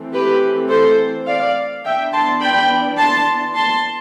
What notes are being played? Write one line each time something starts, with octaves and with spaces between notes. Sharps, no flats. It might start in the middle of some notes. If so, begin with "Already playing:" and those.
Already playing: E3 A3 C4
G4 B4
A4 C5
D5 F5
E3 B3 D4 E5 G5
A5 C6
G5 B5
A5 C6
A5 C6